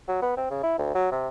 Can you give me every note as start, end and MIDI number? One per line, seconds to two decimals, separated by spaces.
0.08 0.20 54
0.22 0.33 59
0.37 0.47 60
0.51 0.61 49
0.63 0.75 64
0.78 0.93 38
0.94 1.09 54
1.11 1.28 48